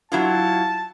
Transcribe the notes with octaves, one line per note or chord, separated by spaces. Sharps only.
F#3 E4 F4 A5